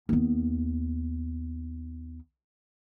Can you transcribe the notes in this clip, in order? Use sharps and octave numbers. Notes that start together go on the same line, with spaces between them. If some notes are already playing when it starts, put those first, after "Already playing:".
D#2 B3